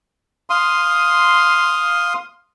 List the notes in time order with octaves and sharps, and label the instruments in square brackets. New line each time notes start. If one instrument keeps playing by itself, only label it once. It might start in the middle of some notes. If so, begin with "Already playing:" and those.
[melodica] F5 C6 D#6